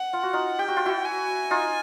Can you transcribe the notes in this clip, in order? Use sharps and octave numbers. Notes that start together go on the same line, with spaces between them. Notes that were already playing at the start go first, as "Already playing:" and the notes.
Already playing: F#5
F4
F#4
D#4 F4
G4 G5
F#4
F4
E4 F#4
G#5
D#4 F4